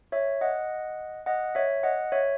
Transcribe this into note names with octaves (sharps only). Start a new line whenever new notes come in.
C#5 E5
D#5 F#5
D#5 F#5
C#5 E5
D#5 F#5
C#5 E5